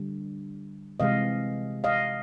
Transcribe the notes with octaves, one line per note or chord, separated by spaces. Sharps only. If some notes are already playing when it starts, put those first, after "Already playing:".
Already playing: D3 G3
C3 E3 G#3 D#5 F5
D#5 F5